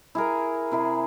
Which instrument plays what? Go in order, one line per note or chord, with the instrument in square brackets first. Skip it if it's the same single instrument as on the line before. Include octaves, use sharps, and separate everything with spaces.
[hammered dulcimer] E4 G#4 A#4
C3 E4 G#4